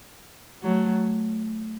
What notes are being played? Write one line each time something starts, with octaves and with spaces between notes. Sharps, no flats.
F#3 A3